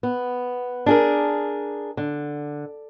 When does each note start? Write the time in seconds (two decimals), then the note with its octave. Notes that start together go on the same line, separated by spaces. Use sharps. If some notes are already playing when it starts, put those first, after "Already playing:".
0.03 B3
0.86 D4 G#4 A#4
1.97 D3